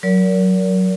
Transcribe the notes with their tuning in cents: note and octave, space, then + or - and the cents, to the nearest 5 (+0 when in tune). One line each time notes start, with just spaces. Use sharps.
F#3 +0 A#4 +0 D5 -45